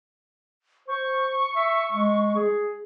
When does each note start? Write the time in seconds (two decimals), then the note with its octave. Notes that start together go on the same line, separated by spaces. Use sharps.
0.88 C5 C#6
1.56 E5
1.92 G#3
2.35 G#4